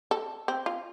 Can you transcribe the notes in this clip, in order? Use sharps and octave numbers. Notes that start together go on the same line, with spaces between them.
A4
C4
F4